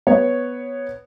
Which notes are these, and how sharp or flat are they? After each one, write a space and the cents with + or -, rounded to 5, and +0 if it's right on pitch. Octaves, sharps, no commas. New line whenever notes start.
B3 +0 C#5 +0